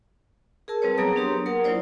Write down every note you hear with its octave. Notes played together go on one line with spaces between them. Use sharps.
G#4 A#4 A5 E6
G3 C4 B4 C#5
F#3 B3 G#4 C#5 A#5 D#6
D4 G4 C6
A#3 A#4 F#5 D#6
F#3 E4 F4 C5 D5